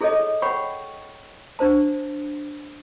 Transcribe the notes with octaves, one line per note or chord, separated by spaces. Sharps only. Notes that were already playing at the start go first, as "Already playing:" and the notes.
E4 G#4 A4 C#5 D#5
C#5 F#5 G5 B5 C#6
D4 C5 A5